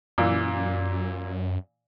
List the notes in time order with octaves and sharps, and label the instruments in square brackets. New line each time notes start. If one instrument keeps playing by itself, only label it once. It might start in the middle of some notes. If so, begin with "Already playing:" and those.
[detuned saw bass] F#2 [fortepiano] A#2 E3